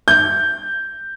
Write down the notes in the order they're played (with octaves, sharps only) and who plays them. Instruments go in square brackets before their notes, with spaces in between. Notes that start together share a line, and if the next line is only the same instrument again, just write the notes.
[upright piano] G6